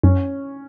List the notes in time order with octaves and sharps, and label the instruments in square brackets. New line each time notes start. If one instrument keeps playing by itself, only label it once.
[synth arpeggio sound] F#2 [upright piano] C#4